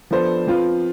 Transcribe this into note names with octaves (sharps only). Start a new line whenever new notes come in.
F3 B3 D4 A4 C5
F3 C4 F4 B4